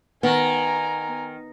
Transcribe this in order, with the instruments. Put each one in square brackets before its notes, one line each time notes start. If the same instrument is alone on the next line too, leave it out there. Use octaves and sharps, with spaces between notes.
[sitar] D#3 [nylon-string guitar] B3 [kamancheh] G#5 A#5